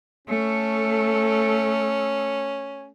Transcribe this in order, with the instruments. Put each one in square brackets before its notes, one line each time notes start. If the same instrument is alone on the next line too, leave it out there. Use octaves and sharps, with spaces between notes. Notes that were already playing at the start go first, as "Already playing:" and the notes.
[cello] A3 A4 [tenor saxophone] C#4